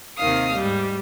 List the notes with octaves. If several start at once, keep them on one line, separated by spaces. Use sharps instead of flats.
D#2 C3 D#3 F5 D#6
G#2 G3